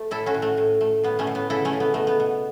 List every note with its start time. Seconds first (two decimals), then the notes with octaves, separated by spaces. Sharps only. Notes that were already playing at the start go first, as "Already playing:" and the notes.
Already playing: A3
0.11 A2 E4 A4
0.26 C#4 F#4
0.34 A2
0.42 A3
0.57 A2
0.81 A3
1.04 A2 B3
1.19 A3 C#4
1.27 A2
1.35 B3
1.50 C#3 E4 A4
1.65 A3 C#4
1.73 C#3
1.80 B3
1.94 B2 A3
2.07 B3
2.20 B2